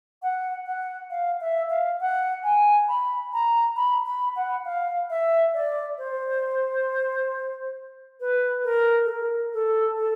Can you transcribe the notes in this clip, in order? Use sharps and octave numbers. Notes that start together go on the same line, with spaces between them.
F#5
F#5
F5
E5
F5
F#5
G#5
B5
A#5
B5
B5
F#5
F5
E5
D5
C5
B4
A#4
A4
A#4
A4
A4